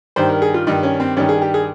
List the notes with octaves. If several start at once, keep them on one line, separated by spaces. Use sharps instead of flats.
G2 D#3 C5
A#4
G#4
F4
G2 D#3 D#4
C#4
C4
G2 D#3 C#4
G#4
G4
G#4